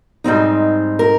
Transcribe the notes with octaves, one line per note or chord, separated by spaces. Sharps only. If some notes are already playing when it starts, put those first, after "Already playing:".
G#2 G3 C4 D#4
A#4